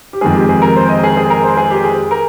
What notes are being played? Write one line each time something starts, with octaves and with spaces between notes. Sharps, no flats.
G4
F2 D#3 G#3 G#4
G4
G#4
A#4
C5
D#5
G#4
G#4
A#4
C5
G#4
G4
G#4
A#4